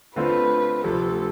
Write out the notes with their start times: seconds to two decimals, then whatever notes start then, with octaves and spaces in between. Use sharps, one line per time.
0.16 D3 A3 C4 F4 B4
0.84 D2 C3 F3 A4